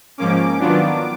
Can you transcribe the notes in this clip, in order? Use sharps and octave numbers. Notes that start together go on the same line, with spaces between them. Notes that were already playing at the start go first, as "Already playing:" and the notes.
G#2 F3 A#3 C#4 D6
D#3 F#3 B3 D4 F4